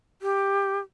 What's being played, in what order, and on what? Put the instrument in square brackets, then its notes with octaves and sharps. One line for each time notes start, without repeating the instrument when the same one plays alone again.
[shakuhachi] G4